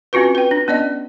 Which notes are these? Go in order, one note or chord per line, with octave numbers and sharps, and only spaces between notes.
C4 C#4 F4 F#4 B4
B4 G5
D4
B3 C#4 D5 D#5